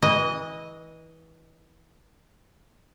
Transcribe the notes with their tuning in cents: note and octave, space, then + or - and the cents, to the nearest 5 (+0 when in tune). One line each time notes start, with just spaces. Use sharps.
E3 -25 D#5 +0